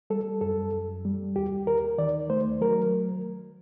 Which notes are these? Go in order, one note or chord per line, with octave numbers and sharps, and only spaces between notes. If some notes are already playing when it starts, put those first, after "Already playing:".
G3 A4
F#2 A4
F#2
G3
D#2 G4
D#2 A#4
D#3 D5
A3 C5
F#3 A#4